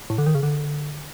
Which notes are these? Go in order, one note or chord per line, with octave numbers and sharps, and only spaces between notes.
A2
D3
D#3
C#3
D3